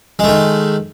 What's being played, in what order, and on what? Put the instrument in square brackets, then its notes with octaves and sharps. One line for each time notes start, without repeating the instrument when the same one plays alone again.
[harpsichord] G#3
A3
D#3